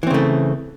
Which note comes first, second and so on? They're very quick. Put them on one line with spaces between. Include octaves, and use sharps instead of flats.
E3 C4 C#3 A3